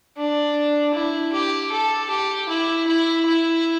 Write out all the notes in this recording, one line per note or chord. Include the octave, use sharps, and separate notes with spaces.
D4
E4
G4
A4
G4
E4
E4
E4